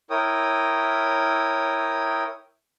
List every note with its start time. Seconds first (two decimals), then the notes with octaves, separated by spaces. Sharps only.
0.10 E4 A#4 C#5 G5 D#6